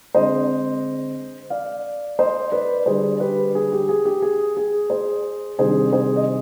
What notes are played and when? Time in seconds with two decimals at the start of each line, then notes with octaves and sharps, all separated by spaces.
0.14 D3 G#3 C4 C5 D#5
1.50 D5 F5
2.19 C5 D#5
2.52 B4 D5
2.86 D3 G3 D4 G#4 C5
3.20 G4 B4
3.55 G#4
3.72 G4
3.89 G#4
4.05 G4
4.22 G#4
4.57 G#4
4.90 G#4 C5
5.58 C3 D#3 G3 D4 G#4 C5
5.93 G#4 C5
6.16 D#5